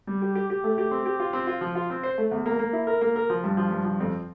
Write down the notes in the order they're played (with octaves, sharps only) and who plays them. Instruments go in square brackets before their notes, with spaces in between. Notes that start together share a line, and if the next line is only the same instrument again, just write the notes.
[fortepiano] G3
G4
G4
G4
A3
G4
C4
G4
F4
C4
F4
F3
F4
C4
C5
A3
E2
A#3
A#3
E4
A#4
A#3
A#4
F3
G2
F3
G2
F3
F2